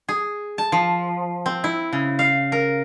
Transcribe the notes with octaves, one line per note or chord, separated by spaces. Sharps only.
G#4
A5
F3
C4
E4
C#3
F5
A#4